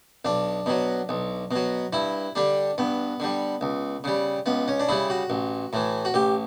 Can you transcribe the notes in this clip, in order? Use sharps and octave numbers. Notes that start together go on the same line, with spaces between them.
B1 D4
B2 F#3
B1
B2 F#3
G2 E4
D3 G3 D4
G2 B3
D3 G3
C#2
C#3 G3
C#2 B3
C#4
D4
C#3 G3 E4
F#4
A1
A2 E3
F#4
A1 G4